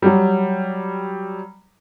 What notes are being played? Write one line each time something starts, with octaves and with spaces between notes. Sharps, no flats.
F#3 G3